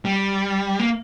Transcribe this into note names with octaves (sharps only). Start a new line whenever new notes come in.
G3
A#3